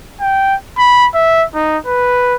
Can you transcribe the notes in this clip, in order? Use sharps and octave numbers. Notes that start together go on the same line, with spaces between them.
G5
B5
E5
D#4
B4